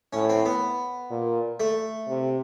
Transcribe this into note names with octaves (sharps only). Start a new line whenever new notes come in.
A2 C#4
C4
B3
A#2
A3
C3